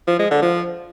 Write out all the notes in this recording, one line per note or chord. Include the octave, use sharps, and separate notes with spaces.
F3
G#3
D3
F3